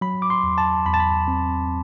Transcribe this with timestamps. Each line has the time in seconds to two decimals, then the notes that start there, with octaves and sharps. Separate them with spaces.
0.01 F#3 B5
0.22 D6
0.30 C6
0.43 E2
0.58 A5
0.86 E2 B5
0.94 A5
1.00 B5
1.28 C4